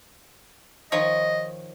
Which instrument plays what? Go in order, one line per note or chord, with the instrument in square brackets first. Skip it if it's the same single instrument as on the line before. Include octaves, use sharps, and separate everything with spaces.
[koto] D#3 F3 C#5 [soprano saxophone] D#5